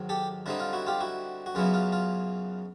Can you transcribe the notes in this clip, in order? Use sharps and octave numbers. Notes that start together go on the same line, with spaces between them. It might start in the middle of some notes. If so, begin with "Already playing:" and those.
Already playing: G#2 D#3 F#3
G4 A4
D3 G3 C4 D#4 E4
F4
E4 F#4
F4 G4
E4 F#4
F#4
F#2 C#3 F#3 B3 E4 F4
F4
F4